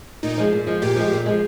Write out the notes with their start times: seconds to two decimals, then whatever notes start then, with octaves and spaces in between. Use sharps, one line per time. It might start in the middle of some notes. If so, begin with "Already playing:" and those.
0.23 A#2 D#4
0.37 F3 G#3
0.53 A#2
0.67 F3 G#3
0.82 A#2 G4
0.96 F3 G#3
1.12 A#2
1.26 F3 G#3